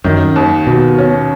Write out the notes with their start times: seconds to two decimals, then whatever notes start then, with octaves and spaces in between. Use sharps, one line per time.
0.04 F#2 D#3
0.36 D#2
0.67 D#2 B2
0.98 C#4